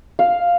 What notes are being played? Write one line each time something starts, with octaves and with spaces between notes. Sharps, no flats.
F5